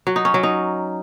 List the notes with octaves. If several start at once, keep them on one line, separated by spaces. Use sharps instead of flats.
F#3
D#4
C#4
F#3
D#4